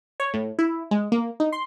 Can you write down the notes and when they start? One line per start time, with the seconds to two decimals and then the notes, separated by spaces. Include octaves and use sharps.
0.20 C#5
0.34 A2
0.59 E4
0.91 G#3
1.12 A#3
1.40 D#4
1.52 C6